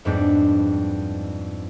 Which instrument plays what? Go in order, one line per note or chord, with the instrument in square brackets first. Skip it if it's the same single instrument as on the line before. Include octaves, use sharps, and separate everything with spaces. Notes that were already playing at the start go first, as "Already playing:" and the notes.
[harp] F2 G#2 G3 B3 C4 D4